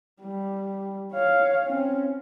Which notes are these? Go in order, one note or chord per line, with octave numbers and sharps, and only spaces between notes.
G3
C#5 F5
C4 C#4